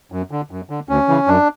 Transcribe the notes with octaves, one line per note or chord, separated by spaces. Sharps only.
F#2
D3
F#2
D3
D2 C#4
C#3 E3
F#2 D4